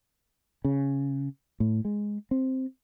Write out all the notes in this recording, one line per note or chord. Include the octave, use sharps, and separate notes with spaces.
C#3
A2
G#3
C4